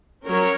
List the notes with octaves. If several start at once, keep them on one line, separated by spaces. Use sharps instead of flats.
F#3 C#4 A#4 C#5